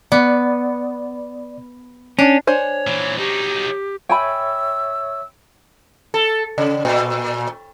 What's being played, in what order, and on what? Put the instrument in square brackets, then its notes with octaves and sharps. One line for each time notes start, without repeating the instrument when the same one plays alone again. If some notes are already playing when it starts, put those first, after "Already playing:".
[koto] B3 [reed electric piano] D5
[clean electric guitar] C#4 [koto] D4
[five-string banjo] D4 C5 G#5 [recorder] C#5
[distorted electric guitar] A#2 E3
[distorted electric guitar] F#3 D#4 [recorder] G4
[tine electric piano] C#5 E5 [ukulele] G5 G#5 B5 [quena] E6
[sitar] A4
C#3
A#2